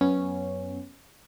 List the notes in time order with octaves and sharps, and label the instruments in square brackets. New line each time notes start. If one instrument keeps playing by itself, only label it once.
[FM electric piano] F#2 B3 C#4